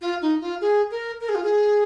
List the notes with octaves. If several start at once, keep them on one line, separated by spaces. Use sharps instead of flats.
F4
D#4
F4
G#4
A#4
A#4
G#4
F4
G#4